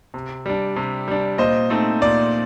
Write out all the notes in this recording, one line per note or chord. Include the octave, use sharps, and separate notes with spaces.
C3
G3 D4
C3
G3 D4
A#2 C5 D#5
A3 C4 D#4
A#2 D5